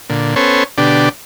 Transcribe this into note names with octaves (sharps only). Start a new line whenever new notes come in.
A#2 D3
B3 C#4 A4 C5 C#5
B2 D3 D4 G4